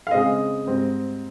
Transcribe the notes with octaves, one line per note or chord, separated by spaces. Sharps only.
F5
C#3 G#3 C4 D#5
G#2 G3 C4